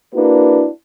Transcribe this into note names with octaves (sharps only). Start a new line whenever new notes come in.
A#3 D4 E4 F#4 B4